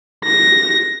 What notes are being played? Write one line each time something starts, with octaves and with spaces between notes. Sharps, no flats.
A#6